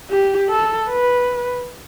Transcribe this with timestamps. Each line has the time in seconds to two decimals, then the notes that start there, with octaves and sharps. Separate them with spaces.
0.11 G4
0.50 A4
0.89 B4